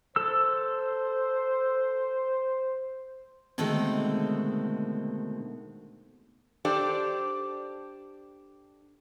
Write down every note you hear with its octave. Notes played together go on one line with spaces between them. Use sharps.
A4 C5 E6
B2 D3 D#3 G#3 A3 C4
D4 G4 A4 C5 D5